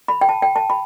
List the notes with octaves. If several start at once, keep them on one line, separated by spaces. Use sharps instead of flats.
B5
G5
A5
G5
A5
B5